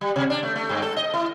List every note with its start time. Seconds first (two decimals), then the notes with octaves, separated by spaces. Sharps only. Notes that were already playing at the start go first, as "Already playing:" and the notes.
0.01 G3
0.16 C3
0.30 D4
0.43 A3
0.56 A3
0.69 G2
0.83 A4
0.96 D#5
1.13 E4